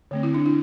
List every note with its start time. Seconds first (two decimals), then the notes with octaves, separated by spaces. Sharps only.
0.11 D3 A3 C4
0.23 E4
0.34 D4
0.46 E4